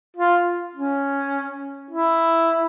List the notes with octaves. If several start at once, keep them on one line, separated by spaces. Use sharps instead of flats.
F4
C#4
E4